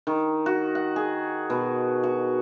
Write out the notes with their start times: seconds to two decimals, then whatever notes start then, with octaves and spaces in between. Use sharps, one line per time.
0.07 D#3
0.46 F#4
0.75 F#5
0.96 G#4
1.50 B2
2.03 F#4